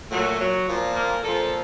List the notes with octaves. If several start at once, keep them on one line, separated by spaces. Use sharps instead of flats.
A#2 F#3 A3
F#3
A#2 F3
A#3
A#2 F3 A4